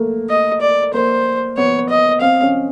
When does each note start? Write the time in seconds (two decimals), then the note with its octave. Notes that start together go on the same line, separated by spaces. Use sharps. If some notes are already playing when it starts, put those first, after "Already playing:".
Already playing: A3 A#3
0.30 D#5
0.61 D5
0.94 A#3 C5
1.57 B3 C#5
1.90 D#5
2.21 C4 F5
2.42 C#4